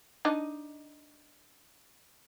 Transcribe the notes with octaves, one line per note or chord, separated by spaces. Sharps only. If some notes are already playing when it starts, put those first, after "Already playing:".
D4 D#4 D#5